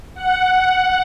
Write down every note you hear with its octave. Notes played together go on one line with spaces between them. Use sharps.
F#5